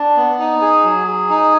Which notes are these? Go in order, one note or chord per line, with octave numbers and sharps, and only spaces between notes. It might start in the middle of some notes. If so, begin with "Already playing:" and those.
Already playing: D4
B3
D#4
G#4
F#3
G#4
D#4